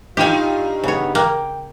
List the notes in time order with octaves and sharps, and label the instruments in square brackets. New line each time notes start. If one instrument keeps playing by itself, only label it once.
[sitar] G2 D#4 [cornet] F4 [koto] G4 G#5
[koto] C#3 C#5 [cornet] B3
[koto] A#3 [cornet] G5